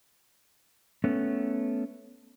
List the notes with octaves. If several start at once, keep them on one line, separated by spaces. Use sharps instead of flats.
A3 B3 C#4